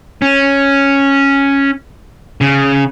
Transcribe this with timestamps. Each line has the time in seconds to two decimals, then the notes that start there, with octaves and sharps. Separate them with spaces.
0.22 C#4
2.41 C#3